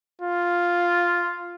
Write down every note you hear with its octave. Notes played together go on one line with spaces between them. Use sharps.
F4